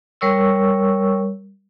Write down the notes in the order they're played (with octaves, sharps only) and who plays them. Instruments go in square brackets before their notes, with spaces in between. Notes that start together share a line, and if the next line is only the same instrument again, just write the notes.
[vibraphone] G3 A#4 C#5 C#6 E6